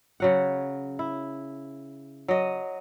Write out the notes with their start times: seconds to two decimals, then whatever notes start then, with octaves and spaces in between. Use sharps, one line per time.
0.20 C#3 F#3 F#5
0.99 E4
2.28 F#3 D#5